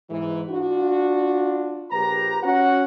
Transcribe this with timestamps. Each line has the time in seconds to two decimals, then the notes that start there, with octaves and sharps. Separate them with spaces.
0.10 G#2 E3
0.49 D4 F4 F#4
1.91 A#1 G4 B4 A#5
2.43 C#4 F#4 F#5